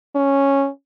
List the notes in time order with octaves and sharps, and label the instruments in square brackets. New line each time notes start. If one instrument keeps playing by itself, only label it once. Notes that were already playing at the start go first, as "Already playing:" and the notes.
[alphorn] C#4